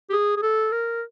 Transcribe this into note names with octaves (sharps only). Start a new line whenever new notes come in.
G4
G#4
G#4
A4
A#4